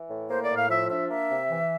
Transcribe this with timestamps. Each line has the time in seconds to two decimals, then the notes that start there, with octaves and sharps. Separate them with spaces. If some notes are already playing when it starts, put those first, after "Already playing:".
Already playing: E3
0.10 A2
0.29 A#3 C5
0.44 D5
0.50 A2
0.56 F5
0.70 F3 E5
0.90 D4 E5
1.09 A#3 E5
1.29 C3
1.49 E3